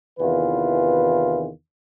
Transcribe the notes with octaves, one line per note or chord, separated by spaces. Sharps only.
E2 C3 D#3 E3 F4 B4